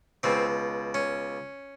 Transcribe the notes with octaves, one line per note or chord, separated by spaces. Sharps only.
C#2 B2 C4
C#4